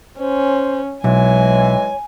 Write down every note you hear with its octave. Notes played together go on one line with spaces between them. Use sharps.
C#4 C5
B1 E3 F#3 G#3 C#5 G#5